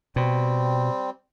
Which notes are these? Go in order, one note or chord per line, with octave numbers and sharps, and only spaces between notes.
B2 G3 C4